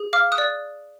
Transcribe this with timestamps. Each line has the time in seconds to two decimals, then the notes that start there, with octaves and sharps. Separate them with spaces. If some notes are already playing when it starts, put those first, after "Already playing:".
Already playing: G#4
0.13 F5 D6 F6
0.32 D#6 F#6
0.38 D5